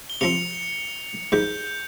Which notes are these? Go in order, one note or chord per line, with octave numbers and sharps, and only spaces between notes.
G7
C3 F3 C4 C#7 F7
G#2 D#3 G3 G6